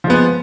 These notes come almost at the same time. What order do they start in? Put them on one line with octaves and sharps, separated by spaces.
F3 G#3 B3